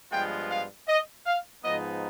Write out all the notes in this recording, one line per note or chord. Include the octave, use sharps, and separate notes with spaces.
G2 F3 G#3 B3 F4 G5
F5
D#5
F5
G#2 F3 B3 D#4 D#5